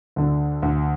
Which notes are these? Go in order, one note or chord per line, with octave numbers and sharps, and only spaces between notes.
D2 D3
D2